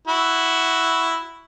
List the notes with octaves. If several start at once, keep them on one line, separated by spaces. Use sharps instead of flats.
E4 F#4